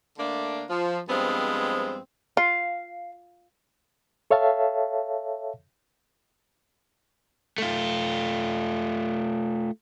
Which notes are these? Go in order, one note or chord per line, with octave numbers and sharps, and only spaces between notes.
D3 A3 A#3 D4
F3
G2 F3 G#3 B3 C4
F4 F5
A4 C#5 E5 F5 A5
A3 F4